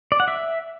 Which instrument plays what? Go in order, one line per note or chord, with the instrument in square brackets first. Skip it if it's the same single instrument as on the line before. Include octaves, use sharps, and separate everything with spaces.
[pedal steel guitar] D5
F#5
E5